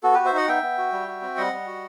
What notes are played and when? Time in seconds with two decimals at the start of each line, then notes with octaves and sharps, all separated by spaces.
0.03 B3 F#4 A4
0.14 F#4 G4 B4
0.25 C5 E5
0.33 D#4 D#5 F#5
0.48 B3 E5 G5
0.63 B3
0.78 F#4
0.92 G3
1.08 F#4
1.22 C4
1.37 G3 D#5 F#5
1.52 G3
1.67 F#4